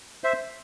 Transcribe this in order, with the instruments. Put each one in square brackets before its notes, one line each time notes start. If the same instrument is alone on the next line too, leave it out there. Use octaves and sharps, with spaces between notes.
[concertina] C5 E5